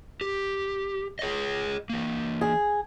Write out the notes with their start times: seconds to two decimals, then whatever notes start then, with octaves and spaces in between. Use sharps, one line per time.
0.21 G4
1.19 G#4 C#5 D#5
1.90 E3 A#3
2.41 G#4